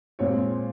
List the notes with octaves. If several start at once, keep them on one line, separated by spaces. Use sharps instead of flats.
A#2 G#3 C4 C#5